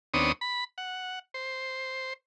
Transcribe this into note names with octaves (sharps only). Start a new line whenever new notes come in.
D#2 B3 C4 D4 C#5 D#6
B5
F#5
C5